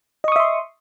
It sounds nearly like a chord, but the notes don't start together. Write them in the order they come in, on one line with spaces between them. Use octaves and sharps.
D#5 C#6 D#6 E5 C6